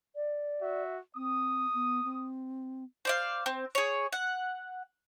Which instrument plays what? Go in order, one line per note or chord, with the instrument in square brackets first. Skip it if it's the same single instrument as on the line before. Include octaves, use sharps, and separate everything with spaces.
[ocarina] D5
[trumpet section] F#4 E5
[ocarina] C4 [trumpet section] D#6
[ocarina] B3
C4
[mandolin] C5 D5 F5
C4
G#4 C#5
F#5